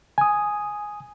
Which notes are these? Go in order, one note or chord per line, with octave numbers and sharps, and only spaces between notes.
G#5 D#6